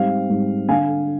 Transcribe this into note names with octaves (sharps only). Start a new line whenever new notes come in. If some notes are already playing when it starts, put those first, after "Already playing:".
Already playing: G#2 G3 C4 F5
G#2 G3 C4
D3 F5 G#5